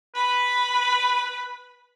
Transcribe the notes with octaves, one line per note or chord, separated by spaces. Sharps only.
B4 B5